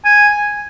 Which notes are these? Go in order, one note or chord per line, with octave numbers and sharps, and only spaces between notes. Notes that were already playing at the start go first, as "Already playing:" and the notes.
G#5